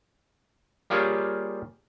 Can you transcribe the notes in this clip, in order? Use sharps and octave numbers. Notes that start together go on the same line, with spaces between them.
G3 A#3 F4 G4 G#4 C#5